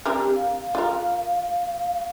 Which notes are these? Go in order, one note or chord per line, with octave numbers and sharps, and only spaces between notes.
C4 D4 G4 A#4
F5
F4 A#4